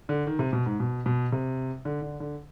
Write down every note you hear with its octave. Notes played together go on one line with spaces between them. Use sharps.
D3
D#3
C3
B2
G#2
B2
B2
C3
D3
D3
D3